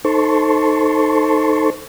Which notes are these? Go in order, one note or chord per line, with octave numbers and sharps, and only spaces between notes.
D#4 A4 C5 A5 C6 C#6